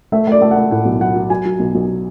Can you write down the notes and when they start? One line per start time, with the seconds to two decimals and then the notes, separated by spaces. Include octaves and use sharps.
0.12 A3 E5
0.27 A3 D5
0.42 A3
0.51 F#5
0.56 A3
0.71 A2 F#5
0.85 B1
1.00 F#3 F#5
1.15 F#3
1.30 F#3 G#5
1.45 F#3
1.59 B1
1.75 B1